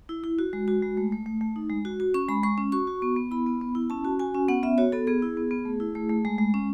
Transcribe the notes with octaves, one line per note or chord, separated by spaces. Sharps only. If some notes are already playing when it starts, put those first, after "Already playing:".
E4
E4
F#4
G#3
F#4
G#3
A3
A3
A3
A3
D#4
G#3
F#4
F#4
C#4 C#6
G#3 B5
G#3 C#6
C#4
F#4 C#6
F#4
B3
B3
E4 B5
B3
B3
E4
C#4 A5
F#4
F#4 G#5
C#4
B3 F#5
B3 E5
F#4 C#5
B3 A4
B3 G#4
E4
B3
B3
A3
E4
A3
A3
G#3
G#3
C#4